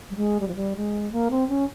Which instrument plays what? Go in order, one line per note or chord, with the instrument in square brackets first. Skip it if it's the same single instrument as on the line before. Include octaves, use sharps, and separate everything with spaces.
[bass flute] G3
G#3
G3
F3
G3
G#3
A#3
C4
C#4